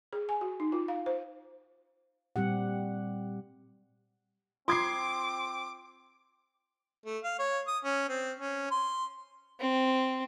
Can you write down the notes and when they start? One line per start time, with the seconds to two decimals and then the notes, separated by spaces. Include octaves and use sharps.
0.13 G#4
0.29 G#5
0.41 F#4
0.60 D#4
0.72 F4
0.88 F5
1.06 C5
2.36 A#2 G3 C4 G4 F#5
4.68 C4 F4 C6 D6 D#6 G#6 C7
7.06 A3
7.24 F5
7.39 C#5
7.67 D#6
7.84 C#4
8.09 C4
8.39 C#4
8.71 C6
9.60 C4